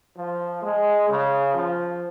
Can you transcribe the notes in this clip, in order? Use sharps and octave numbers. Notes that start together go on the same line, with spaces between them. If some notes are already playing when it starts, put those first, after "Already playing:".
F3
G#3
C#3
F3